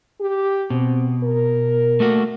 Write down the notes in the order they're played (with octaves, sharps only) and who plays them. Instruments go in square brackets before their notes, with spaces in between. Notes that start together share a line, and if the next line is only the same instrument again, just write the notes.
[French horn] G4
[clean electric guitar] B2 [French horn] C4
[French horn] A#4
[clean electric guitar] A3 A#3 F#4